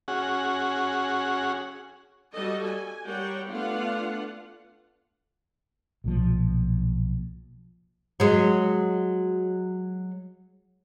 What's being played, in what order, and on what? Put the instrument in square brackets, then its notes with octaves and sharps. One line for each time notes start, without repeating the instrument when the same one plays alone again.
[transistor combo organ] C#4 F#4 G#4 F#5
[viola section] G3 F#4 A4 D#5
G#5
G3 A#4 C#5 F#5 G5
A3 B3 D4 F4 F5 F#5
[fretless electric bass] B1 A#2 F3
[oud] F#3 G#3